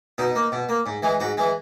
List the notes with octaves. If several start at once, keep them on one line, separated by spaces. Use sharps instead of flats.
B2 D#4
A#3
B2
A#3
G#2
E3 G#3
G#2 F#4
E3 G#3